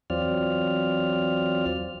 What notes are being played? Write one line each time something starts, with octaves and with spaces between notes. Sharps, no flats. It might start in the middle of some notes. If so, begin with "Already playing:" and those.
E2 F#3 C4 F4 D5 F6